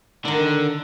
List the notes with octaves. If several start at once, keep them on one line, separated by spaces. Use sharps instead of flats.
D3 D#3 D4 A#4